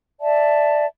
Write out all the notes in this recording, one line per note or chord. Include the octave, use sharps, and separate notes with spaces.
D5 E5 A5